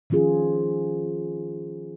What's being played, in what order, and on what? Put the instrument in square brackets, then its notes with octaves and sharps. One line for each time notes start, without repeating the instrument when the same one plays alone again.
[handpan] D#3 F3 C#4 F4 G#4